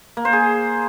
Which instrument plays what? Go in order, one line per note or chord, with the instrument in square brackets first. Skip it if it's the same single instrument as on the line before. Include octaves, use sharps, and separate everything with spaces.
[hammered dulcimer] A#3
C5
G#4